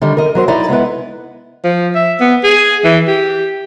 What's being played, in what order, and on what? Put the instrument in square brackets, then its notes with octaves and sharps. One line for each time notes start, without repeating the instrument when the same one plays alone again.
[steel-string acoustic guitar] D3 D#3 G3
A#4 D#5
F#3 A#4 C5
D#4 E4 D5 D#5 A#5
G#3 B3 E4 B4
[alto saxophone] F3
E5
B3
G#4
E3
G4